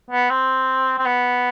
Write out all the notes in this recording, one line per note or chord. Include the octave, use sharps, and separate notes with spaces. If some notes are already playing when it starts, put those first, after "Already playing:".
B3
C4
C4
B3